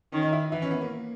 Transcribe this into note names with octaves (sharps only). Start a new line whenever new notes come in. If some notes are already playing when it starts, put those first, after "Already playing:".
D#3 C#4
D#4
E4
E3 E4
C#4
B3
A#3